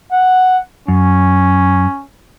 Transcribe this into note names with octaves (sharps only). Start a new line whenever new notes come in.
F#5
F#2 C#4